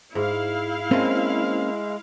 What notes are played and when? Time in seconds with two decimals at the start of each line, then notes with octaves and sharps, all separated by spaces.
0.15 G#2 E4 F5
0.91 G#3 A#3 C4 C#4 C5 G5 A5